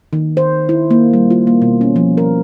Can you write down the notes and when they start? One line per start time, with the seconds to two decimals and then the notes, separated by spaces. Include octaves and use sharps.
0.13 D#3
0.37 C5
0.69 E4
0.91 A#3
1.14 G3
1.31 F4
1.47 A#3
1.62 B2
1.81 C#4
1.96 F3
2.17 A#4